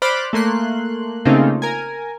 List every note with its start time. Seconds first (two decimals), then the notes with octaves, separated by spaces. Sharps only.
0.02 C5 D5 B5 D6 F6 F#6
0.33 A3 A#3 C6 F#6
1.25 C#3 A3 A#3 C4 D#4 F4
1.62 A#4 G#5